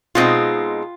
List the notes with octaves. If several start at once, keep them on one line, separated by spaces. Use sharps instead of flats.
B2 G#3 C4 D#4 F4